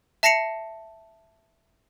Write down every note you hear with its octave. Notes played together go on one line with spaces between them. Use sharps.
E5 A5 A#6 C7 C#7 F7